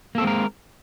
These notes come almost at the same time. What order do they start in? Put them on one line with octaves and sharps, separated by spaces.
A#3 A4 C4 G#3 A#4